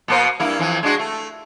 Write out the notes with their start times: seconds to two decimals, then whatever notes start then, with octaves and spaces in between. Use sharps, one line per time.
0.08 B2 A#3 C5
0.40 G2 A#3 E4
0.59 F2 E3
0.83 G#3 D4 F#4
0.99 A3